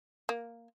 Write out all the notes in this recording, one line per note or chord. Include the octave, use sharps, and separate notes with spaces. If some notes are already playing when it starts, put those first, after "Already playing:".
A#3